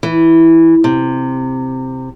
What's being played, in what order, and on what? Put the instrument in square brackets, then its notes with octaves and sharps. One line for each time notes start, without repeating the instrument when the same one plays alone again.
[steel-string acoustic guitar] E3
C3